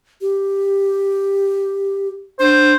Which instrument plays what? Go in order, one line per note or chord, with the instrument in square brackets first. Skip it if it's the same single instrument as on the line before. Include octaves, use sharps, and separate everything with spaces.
[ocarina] G4
[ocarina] D4 [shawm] C5